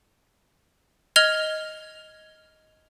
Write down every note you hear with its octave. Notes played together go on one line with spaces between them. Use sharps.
D#5 F6 G#6 F7 G7